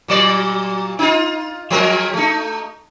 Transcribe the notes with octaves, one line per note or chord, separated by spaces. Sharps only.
A#2 F#3 D5
D#4 F4
F3 G#3 A#4
A3 D#4